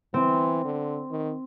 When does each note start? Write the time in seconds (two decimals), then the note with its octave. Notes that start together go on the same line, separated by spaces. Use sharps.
0.14 E3 C4
0.65 D3
1.11 D#3